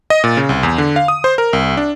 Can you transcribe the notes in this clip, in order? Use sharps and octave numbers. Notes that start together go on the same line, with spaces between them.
D#5
A#2
C#3
C2
E2
D3
F5
D#6
C5
A#4
C2
D4